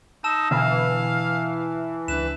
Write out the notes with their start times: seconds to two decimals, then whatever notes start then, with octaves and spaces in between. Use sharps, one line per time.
0.24 D#4 A5 E6 E7
0.51 B2 D3 E3 B3 F5
2.08 C#2 D4 B4 E7